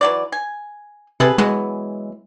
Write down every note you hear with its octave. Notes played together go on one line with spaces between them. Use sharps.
E3 F#3 D5
G#5
C3 G#4 A4 B4
E3 F#3 G#3 B3